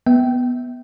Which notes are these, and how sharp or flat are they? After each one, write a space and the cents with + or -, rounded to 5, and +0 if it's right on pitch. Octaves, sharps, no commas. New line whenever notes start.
B3 +0 E5 -15 G5 -20